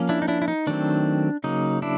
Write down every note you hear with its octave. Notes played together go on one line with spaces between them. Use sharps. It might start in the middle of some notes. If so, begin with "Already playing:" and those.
Already playing: F3 A#3 C#4
D4 E4
D#4
D4 E4
E4
D#4
D#3 F#3 A3 C4 D4
C#3 F#3 A#3 D#4
D4 E4